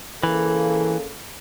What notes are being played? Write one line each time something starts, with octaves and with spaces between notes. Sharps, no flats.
C#3 E3 A#3 A4